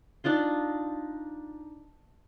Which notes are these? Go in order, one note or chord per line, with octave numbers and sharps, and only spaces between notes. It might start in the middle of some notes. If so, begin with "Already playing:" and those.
D4 D#4 F4 C6